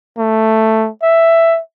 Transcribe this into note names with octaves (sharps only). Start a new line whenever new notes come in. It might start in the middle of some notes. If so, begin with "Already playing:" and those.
A3
E5